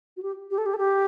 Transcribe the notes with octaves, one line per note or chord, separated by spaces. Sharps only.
F#4
G4
G4
A4
G4
A4
G4